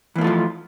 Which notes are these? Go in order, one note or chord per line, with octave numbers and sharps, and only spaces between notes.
E3 F3 A3 A#3 F4